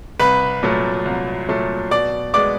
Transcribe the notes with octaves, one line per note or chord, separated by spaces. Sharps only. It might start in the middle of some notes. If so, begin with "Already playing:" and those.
C2 B4 B5
A#2 F#3 A3
C2
A#2 F#3 A3
B2 D5 D6
G#3 B3 D5 D6